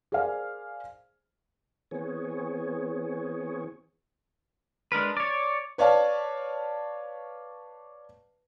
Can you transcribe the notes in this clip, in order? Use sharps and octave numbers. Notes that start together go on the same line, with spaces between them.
G#4 A#4 C5 D5 F5 G#5
E3 B3 C4 G#4 C#5
G#3 D4 A#4 B4
C#5 D5
B4 C#5 D5 F5 A5